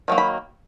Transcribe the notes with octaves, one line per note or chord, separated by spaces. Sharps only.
D#3 F#3 A#3
B5